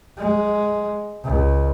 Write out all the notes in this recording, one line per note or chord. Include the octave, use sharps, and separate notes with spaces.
G#3
C#2